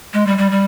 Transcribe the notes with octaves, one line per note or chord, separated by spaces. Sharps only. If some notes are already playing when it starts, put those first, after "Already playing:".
G#3
G3
G3
G3